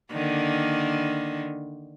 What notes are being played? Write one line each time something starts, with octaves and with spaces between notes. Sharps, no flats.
D3 D#3 A#3